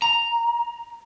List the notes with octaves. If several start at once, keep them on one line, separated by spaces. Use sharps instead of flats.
A#5